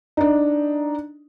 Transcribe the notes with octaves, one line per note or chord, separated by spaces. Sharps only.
D4 D#4